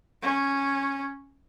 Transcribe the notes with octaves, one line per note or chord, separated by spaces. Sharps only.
C#4